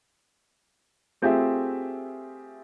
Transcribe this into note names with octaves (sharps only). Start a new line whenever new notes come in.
A3 C4 F4 G4 G#4 E5